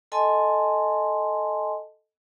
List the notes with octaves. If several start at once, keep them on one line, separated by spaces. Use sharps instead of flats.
A4 D#5 G#5 A5 C6